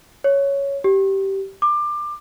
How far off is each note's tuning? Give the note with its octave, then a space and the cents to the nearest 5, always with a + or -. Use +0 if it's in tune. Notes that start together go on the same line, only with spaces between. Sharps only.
C#5 +5
G4 -15
D6 +25